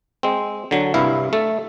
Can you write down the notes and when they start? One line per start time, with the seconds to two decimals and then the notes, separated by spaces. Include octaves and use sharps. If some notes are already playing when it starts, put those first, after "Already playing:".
0.23 G#3 C4
0.71 D3 F#3
0.94 C2 G2 E4 F5
1.33 A3 A4